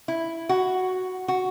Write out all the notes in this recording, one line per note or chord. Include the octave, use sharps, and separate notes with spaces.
E4
F#4
F#4